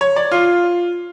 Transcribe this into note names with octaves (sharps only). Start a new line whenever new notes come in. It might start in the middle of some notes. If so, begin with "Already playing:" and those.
C#5
D5
F4